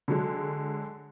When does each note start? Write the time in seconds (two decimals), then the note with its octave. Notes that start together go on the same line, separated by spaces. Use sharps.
0.08 D3 F#3 G#3